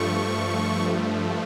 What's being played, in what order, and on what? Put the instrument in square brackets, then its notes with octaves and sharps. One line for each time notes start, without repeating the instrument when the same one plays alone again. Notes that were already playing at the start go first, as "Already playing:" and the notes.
Already playing: [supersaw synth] G2 F3 A3 C#6